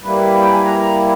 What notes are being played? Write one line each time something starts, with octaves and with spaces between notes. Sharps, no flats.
G3 A#3 E4 B4
G5
G#5
A#5
A#5